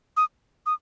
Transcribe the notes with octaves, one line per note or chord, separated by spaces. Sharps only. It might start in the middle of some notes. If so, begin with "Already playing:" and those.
D#6
D#6